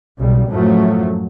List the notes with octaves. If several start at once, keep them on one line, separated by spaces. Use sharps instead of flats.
B1 C#3 G3
F#2 A2 F3 F#3 A3